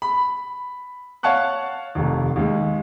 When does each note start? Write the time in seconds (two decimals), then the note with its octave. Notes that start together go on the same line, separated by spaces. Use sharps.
0.02 B5
1.23 C#5 F5 F#5 A5 C#6 F#6
1.95 F1 D#2
2.36 D#2 G#3